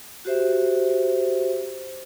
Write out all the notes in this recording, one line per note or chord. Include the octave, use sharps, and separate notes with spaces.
F#4 G4 C5 E5